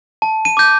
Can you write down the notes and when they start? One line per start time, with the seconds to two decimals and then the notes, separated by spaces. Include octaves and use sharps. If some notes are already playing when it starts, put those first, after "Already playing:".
0.22 A5
0.45 D#7
0.57 D6 G6